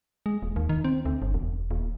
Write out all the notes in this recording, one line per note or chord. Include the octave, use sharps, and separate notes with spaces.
G#3
D#1
D#2
D#3
C4
D2
G1
E1
D#1